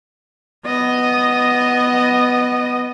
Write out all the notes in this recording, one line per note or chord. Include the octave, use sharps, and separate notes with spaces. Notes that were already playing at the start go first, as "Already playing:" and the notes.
B3 D#5